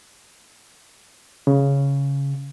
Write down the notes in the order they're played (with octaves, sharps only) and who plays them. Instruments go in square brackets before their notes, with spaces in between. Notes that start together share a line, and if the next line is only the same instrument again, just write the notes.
[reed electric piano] C#3